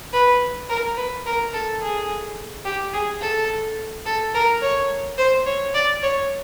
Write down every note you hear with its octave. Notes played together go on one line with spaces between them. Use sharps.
B4
A#4
B4
A#4
A4
G#4
G4
G#4
A4
A4
A#4
C#5
C5
C#5
D5
C#5